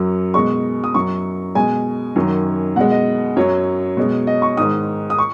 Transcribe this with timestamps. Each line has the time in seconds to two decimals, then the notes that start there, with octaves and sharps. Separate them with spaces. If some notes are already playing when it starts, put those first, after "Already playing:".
Already playing: F#2 F#3
0.34 B2 G#3 C#6
0.84 D#6
0.94 F#2 F#3 C#6
1.55 B2 G#3 G#5
2.16 F#2 D#3 F#3
2.76 B2 G#3 F#5
2.91 D#5
3.36 F#2 F#3 C#5
3.97 B2 G#3
4.27 D#5
4.42 C#6
4.57 G#2 D#3 G#3 D#6
5.10 D#6
5.18 C#6